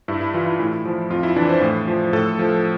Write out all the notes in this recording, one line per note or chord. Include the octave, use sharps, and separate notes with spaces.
G2 E4
E4
E3 F4
E4
A2 E4
F3
F2 F4
E4
E3 D4
C5
A2
F3
A2 A4
F3